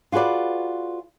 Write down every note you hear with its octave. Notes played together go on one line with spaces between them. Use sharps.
F4 F#4 G#4 B4 D5